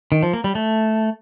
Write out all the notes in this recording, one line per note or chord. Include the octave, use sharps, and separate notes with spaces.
D#3
F3
A#3
G3
A3